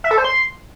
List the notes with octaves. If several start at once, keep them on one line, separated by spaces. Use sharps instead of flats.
E5
A4
C5
C6